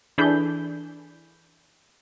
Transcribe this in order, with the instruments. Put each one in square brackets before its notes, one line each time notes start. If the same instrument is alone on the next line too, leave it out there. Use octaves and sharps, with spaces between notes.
[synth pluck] E3 D4 G#4 A4 B5 G6